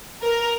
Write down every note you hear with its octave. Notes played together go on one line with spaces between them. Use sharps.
A#4